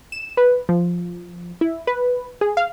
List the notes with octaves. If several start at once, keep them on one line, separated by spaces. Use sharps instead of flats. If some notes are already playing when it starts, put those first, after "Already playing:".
E7
B4
F3
E4
B4
G#4
F5